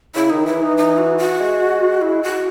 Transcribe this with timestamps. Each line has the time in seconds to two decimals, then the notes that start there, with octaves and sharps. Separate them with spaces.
0.15 C#3 E4
0.30 D#3 D#4
0.46 E3 E4
0.62 E3 D#4
0.77 D#4
0.98 F#4
1.18 F#4
1.40 G#3
2.01 E4
2.23 F#4